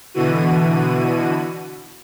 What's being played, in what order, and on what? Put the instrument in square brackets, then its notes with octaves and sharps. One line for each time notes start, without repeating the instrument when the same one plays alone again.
[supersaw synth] B2 D3 E3 F#4 D#7